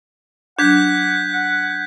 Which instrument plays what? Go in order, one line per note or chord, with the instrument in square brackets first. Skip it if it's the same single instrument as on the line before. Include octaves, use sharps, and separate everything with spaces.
[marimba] F#3 D4 [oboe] F#5 [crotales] G6 G#6 B6
[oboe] F#5